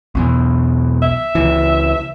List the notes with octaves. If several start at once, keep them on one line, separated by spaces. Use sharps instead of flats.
B1 E2
E5
C#2 E3